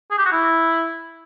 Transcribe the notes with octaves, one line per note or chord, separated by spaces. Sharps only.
G#4
G4
F#4
E4